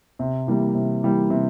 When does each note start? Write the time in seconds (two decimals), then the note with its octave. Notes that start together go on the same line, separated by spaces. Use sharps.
0.19 C3
0.47 E3 G3 A#3
0.75 C3
1.03 E3 G3 A#3
1.30 C3